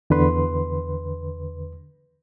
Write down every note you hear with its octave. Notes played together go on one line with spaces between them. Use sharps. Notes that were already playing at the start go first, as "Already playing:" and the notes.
E2 D3 B4 C6